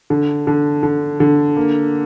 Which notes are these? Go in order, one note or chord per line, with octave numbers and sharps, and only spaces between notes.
D3
D3
D3
D3
A#3